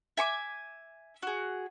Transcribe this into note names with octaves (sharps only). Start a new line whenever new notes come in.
E5 G#5 C#6 D6
F#4 G#4